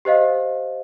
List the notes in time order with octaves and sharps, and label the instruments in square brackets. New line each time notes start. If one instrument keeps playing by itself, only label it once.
[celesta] G4 C5 D#5 F5